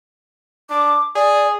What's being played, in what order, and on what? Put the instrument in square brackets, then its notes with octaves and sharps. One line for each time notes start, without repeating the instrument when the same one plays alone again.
[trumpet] D4 [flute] D6
[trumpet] G#4 [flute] D5